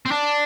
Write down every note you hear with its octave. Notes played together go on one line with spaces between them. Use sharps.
C4
D4